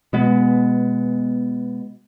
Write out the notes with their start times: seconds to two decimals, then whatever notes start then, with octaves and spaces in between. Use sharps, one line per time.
0.13 B2 G#3 B3